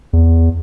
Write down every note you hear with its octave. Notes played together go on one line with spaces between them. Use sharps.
E2